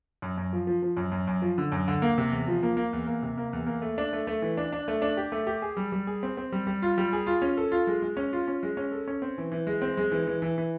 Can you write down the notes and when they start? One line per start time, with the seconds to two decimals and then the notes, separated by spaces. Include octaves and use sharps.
0.22 F#2
0.38 F#2
0.53 F3
0.67 F3
0.82 F3
0.97 F#2
1.12 F#2
1.27 F#2
1.42 F3
1.58 D3
1.72 F#2
1.88 D3
2.02 A#3
2.18 C3
2.32 E2
2.48 F3
2.63 A#3
2.77 A#3
2.93 E2
3.07 A#3
3.22 C3
3.38 A#3
3.53 E2
3.67 A#3
3.82 A3
3.98 D4
4.13 A3
4.27 A3
4.42 E3
4.57 D4
4.72 D4
4.88 A3
5.02 D4
5.17 G4
5.32 A3
5.47 G4
5.62 G#4
5.77 G3
5.92 G3
6.07 G#4
6.23 C4
6.37 C4
6.52 G3
6.67 G3
6.82 F4
6.98 G3
7.13 G#4
7.27 F4
7.42 C#4
7.57 A4
7.72 F4
7.87 G#3
8.02 G#3
8.17 C#4
8.33 F4
8.48 C#4
8.63 G#3
8.77 C#4
8.92 A4
9.07 C#4
9.22 C4
9.38 E3
9.52 E3
9.67 G#3
9.82 C4
9.97 G#3
10.12 E3
10.27 E3
10.42 E3
10.58 E3